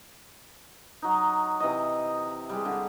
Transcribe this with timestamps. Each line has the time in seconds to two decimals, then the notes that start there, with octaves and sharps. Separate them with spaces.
1.02 F#3 D#4
1.60 C3 E3 D#5
2.49 G3 G#3
2.65 D3